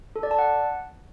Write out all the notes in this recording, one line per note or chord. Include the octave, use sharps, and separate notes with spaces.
A4
D5
A5
F#5